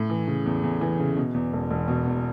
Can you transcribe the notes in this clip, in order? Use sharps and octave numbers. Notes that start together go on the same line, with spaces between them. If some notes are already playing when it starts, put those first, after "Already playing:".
Already playing: A2
E3
C#3
E2
E2
E3
C#3
B2
E2
E1
E1
B2
E2